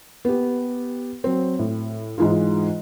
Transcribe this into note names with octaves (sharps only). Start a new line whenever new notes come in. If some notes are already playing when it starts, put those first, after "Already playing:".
B3 G4
F#3 C4
A2
G#2 E3 G#3 D#4 F4